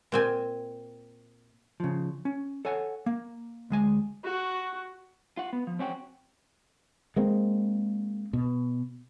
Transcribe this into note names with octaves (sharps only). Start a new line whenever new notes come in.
A#2 C4 G#5
C#3 F3
C#4
A4 C#5 F#5 G#5
A#3
D2 G#3 G#5
F#4
F4 F#5
B3
F3
C4 C#4 F#4 G5
G#3 A#3 C4
B2